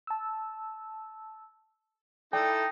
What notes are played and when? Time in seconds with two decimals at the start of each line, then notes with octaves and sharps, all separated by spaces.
0.07 A5 E6
2.33 D#4 E4 A4 D5 G5